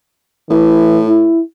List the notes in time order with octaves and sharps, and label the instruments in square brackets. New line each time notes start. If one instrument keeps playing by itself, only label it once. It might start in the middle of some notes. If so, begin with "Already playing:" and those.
[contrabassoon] A2 [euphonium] E3
[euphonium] E4